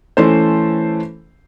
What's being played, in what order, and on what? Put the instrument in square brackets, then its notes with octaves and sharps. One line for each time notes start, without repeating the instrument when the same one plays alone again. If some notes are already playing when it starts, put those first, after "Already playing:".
[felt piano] E3 A3 C#4 A4 C5